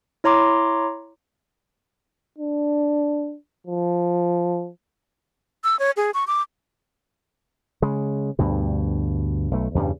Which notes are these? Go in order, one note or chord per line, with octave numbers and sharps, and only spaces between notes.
E4 C#5 A#5 C6 D6
D4
F3
E6
C#5
G#4
C#6
D6
C#3 G#3
D2 G2 B2
B1 A3
E2 G2 C#3 G3